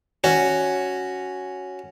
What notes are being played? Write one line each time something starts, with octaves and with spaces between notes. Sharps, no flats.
C#4 F#4